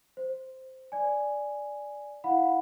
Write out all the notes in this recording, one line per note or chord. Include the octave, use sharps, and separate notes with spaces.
C5
D5 G#5
E4 F5 F#5 B5